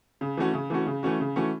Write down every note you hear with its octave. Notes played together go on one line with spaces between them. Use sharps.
C#3
E3 A3 C#4 F#4
C#3
E3 A3 C#4 F#4
C#3
E3 A3 C#4 F#4
C#3
E3 A3 C#4 F#4